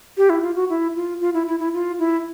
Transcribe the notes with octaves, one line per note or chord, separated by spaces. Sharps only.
G4
E4
F4
F#4
E4
F4
F4
E4
E4
E4
F4
E4